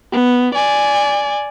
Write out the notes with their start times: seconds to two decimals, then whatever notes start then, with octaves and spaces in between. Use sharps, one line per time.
0.12 B3
0.55 D5 G#5